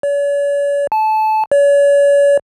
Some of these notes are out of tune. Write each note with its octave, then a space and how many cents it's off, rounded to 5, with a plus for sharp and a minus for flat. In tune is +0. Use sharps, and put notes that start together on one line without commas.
C#5 +45
A5 -20
C#5 +40